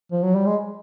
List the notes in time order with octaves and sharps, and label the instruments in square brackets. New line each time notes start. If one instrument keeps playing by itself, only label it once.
[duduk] F3
F#3
G3
G#3